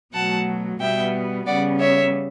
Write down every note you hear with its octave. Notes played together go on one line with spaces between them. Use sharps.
B2 F#3 A3 F#5 A5
B2 G3 B3 E5 G5
C#3 G3 B3 D5 F#5
C#5 E5